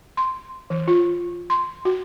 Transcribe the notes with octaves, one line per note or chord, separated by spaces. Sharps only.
C6
E3
F4
C6
F#4